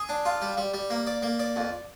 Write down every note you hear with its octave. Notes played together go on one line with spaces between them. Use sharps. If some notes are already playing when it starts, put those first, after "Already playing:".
Already playing: G#4
D4
F4
G3
G3
G3
A#3
D5
A#3
D5
F2